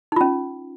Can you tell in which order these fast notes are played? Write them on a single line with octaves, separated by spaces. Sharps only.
D#4 F4 C#4